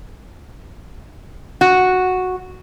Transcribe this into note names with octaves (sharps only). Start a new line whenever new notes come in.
F#4